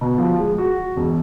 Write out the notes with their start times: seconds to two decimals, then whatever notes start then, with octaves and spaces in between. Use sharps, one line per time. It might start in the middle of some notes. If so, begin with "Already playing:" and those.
0.01 B2
0.18 F3
0.39 G#3
0.58 F#4
0.96 E1